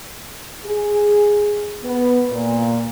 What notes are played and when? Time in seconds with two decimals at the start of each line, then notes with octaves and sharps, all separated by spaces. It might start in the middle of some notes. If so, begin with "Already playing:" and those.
0.65 G#4
1.83 B3
2.30 A#2